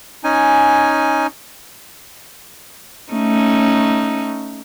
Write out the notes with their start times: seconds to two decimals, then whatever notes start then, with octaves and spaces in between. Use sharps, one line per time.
0.24 C#4 D#4 G#5
3.12 A3 C#4 D#4